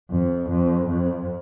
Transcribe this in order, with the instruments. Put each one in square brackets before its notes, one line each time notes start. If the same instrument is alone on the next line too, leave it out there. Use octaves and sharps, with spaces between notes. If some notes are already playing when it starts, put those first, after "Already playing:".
[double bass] F2
F2
F2